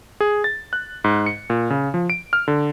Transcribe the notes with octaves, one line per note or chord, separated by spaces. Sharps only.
G#4
A6
F#6
G#2
C#7
A#2
C#3
F3
D7
F6
D3